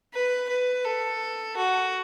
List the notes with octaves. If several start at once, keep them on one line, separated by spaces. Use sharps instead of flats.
B4
B4
A4
F#4